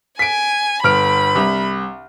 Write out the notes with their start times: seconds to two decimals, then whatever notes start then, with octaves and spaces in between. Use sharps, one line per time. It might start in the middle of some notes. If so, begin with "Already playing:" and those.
0.19 G#5 B6 D7
0.84 G1 B5 F6 D7
1.35 C2